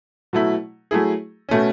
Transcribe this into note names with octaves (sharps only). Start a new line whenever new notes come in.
B2 F#3 A3 E4
F#3 A3 E4 G#4
B2 A3 C#4